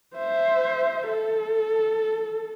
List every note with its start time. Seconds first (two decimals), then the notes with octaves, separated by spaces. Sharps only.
0.16 C5 E5
1.09 A4